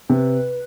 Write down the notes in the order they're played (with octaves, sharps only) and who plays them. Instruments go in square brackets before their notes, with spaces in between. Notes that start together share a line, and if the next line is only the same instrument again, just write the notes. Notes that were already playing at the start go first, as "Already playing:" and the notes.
[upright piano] C3 [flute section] B4